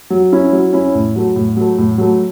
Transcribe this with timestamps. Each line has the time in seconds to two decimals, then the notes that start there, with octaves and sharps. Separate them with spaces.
0.10 F#3
0.32 C#4 E4
0.52 F#3
0.73 C#4 E4
0.95 A2
1.16 F#3 A3
1.36 A2
1.57 F#3 A3
1.78 A2
1.98 F#3 A3